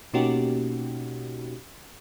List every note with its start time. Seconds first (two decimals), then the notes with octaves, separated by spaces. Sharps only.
0.14 B2 A#3 C#4 D#4 F#4 G4